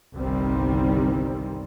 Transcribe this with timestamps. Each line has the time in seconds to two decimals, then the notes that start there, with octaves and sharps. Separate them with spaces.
0.16 G1 C2 D#3 G3 C4